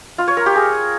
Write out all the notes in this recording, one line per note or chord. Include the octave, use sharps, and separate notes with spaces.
F4
C#5
A#4
G4
G#4